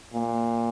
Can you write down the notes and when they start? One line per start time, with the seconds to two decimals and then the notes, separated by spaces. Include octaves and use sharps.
0.14 A#2 A#3
0.32 A#3